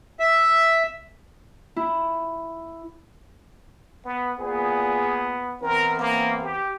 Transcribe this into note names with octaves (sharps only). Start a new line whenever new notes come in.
E5
E4
B3
A#2 B3 G#4
E3 B3 C4 A#4
A#3
G4